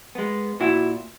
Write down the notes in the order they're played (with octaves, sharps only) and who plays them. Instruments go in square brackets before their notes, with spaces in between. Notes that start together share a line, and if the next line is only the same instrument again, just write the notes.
[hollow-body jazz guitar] G#3 B3
A#2 E4 F#4